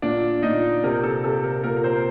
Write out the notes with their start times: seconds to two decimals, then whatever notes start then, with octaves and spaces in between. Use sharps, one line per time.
0.02 A#2 D4 D5
0.42 A#2 D#4 D#5
0.84 C3 A#4
1.03 A4
1.24 C3 A4
1.44 A#4
1.64 A#2 A#4
1.77 A#4
1.84 C4 C5